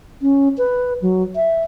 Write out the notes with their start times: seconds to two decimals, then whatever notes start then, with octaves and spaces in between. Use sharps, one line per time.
0.22 C#4
0.58 B4
1.02 F#3
1.36 E5